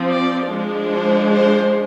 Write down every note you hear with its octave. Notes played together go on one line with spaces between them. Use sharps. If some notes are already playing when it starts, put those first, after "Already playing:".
Already playing: F3 C4
D5
F3 G#3 D4
C5
C5